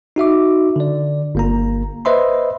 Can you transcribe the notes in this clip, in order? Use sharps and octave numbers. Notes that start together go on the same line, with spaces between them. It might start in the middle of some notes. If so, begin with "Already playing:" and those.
D#4 F#4 E5 D6
D3 D5
G1 A#3 A#5
B4 C5 D#5 E5 B5 C6